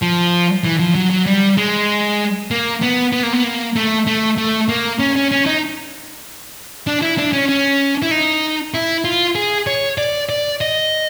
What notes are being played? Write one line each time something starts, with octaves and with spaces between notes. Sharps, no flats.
F3
E3
F3
F#3
F#3
G3
G#3
A#3
B3
B3
A#3
B3
A#3
A3
A3
A3
A#3
C#4
C#4
C#4
D#4
D4
E4
D4
C#4
C#4
E4
D#4
E4
F4
G#4
C#5
D5
D5
D#5